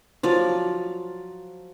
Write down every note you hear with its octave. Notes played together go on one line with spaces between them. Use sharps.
F3 F#3 D5